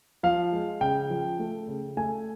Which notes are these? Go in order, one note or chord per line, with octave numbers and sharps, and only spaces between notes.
F3 F5
G#3
C#3 G5
F3
A3
C#3
A3 G#5